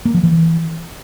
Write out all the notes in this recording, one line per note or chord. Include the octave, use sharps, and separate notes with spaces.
A#3
F3
E3